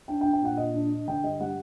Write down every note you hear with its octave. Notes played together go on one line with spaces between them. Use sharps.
D4 G5
G5
D4
G5
A#2 F#5
A#2 D#5
D4
D4
D3 G5
G2 D#5
G3 F#5